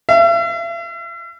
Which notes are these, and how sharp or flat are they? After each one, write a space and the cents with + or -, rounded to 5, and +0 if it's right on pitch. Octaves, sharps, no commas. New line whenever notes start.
E5 +45